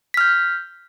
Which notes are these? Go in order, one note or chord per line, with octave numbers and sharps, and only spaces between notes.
F6 G6 B6